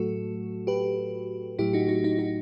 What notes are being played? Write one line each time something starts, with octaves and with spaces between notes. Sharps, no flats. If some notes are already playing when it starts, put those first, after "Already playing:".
Already playing: A2 F#3 A3 F#4 A4
G4 B4
A2 F#3 A3 E4 G4
D#4 F#4
D#4 F#4
D#4
D#4 F#4